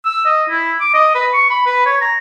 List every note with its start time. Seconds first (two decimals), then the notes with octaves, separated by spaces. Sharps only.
0.05 E6
0.26 D#5
0.49 E4
0.81 D6
0.94 D#5
1.15 B4
1.33 C#6
1.50 B5
1.66 B4
1.86 C#5
2.01 A#5